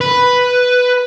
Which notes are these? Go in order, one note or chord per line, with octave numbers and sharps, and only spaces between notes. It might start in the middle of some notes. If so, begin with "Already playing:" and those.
B4